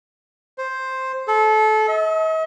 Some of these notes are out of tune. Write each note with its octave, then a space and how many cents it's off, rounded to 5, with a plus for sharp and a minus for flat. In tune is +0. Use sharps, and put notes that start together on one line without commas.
C5 +5
A4 -25
D#5 +45